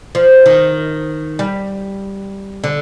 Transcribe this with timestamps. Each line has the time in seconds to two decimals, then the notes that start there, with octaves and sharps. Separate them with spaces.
0.15 F3
0.46 D#3
1.39 G3
2.64 D3